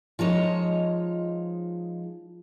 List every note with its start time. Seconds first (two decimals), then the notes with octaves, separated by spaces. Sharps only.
0.19 F3 G#3 D#4 C#5